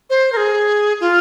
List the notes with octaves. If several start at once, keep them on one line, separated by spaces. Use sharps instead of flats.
C5
A#4
G#4
F4